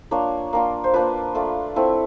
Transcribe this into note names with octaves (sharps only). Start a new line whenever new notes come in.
A#3 D4 F4 C#5
A#3 D4 F4
C5
A#3 D4 F4 B4
A3 D4 F4
A3 C4 E4